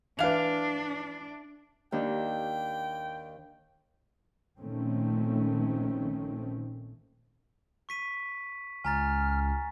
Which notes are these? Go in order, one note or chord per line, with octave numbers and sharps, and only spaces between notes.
E3 D4 B4 F5 F7
D#2 D4 D#4 G5
A#1 A#2 D#3 A3 C4 C#4
C#6 B6 D#7
C#2 G#5 A#5 F6 A6